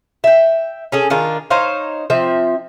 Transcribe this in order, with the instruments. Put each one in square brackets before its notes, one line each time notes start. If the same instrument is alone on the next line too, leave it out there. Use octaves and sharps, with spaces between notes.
[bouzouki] E5 G5
C#4 G#4 A4
D#3 D4 F4 G#4
D#4 C5 C#5 F5
F3 C4 E5